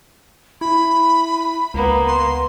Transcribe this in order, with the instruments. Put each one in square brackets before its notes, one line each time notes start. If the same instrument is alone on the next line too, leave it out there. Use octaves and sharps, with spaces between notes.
[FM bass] E4 [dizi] B5
[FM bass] C#2 [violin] A#3 B3
[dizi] C6